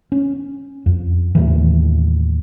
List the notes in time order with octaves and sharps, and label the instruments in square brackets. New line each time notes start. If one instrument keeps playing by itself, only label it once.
[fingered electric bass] C#4
F2
D#2 A2 E3